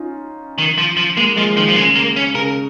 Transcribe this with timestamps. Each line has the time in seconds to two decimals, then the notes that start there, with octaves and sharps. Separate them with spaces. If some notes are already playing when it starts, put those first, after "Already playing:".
Already playing: C#4 D#4 F4
0.58 D#3
0.78 F3
0.97 F3
1.17 G#3 A#3
1.36 F3 G#3
1.57 D#3 F3
1.68 F3
1.76 C#3 G#3
1.95 A#3
2.16 C#4
2.35 C#3 A#4